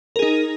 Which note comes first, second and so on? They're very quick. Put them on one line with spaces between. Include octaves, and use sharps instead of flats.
A#4 G#4 D#4